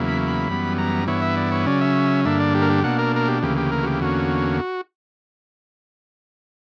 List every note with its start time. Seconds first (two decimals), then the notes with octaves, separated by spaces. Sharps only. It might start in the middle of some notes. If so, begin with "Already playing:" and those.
Already playing: E2 C#3 F#3 A#3 E4
0.08 B5
0.28 B5
0.48 F#2 E3 G3 B3
0.78 A#5
1.07 G2 E3 B3 E4 C#5
1.22 E5
1.37 D5
1.52 C#5
1.66 C#3 F#3 C#4 D5
1.81 E5
2.25 G2 D3 A#3 D4 E5
2.40 D5
2.55 G4
2.62 A#4
2.70 G4
2.84 B2 A#3 D4 F#5
2.99 A#4
3.16 A#4
3.28 G4
3.43 D2 C#3 E3 A#3 G4
3.58 G4
3.72 A#4
3.83 F#4
3.86 G4
4.02 E2 D3 A#3 C#4 F#4